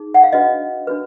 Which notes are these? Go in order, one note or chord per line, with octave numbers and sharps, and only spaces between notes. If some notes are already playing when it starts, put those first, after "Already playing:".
Already playing: D#4 G#4
F#5
F5
D4 F#4 B4 D#5
D4 F#4 B4